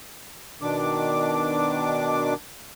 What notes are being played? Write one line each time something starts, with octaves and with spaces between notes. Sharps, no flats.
B2 D#3 D4 D6